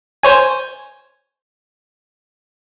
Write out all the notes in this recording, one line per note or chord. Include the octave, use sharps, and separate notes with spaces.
C5 C#5 G#5